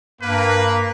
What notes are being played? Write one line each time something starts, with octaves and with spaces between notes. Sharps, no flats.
G2 A#3 B4